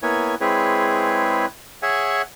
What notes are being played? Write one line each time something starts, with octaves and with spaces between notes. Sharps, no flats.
A#3 B3 E4 C#5 G#5
G#3 C4 E4 G#4 B4 C#5
G#4 C#5 E5 F#5 G#5